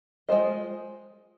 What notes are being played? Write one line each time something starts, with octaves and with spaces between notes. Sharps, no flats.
G#3 D4 F4 C5 D#5